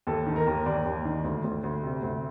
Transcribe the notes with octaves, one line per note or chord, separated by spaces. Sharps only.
D#2 A4
D#3
A#4
D#2
D#2 D5
D#2
D#3
D2
D2
D2
C3
D2